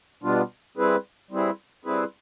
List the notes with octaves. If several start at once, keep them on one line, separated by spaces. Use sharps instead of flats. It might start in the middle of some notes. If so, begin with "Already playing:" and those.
B2 G3 B3 D4 F4
G3 C4 E4 G#4 B4
G3 C4 E4 G#4 B4
G3 C4 E4 G#4 B4